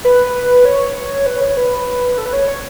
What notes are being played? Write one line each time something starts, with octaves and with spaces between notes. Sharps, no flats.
B4
C#5
B4
C#5
B4
A4
B4
C#5
C#5